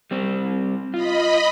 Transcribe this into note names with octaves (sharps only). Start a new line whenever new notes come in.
G3 C4
F4 D#5 B5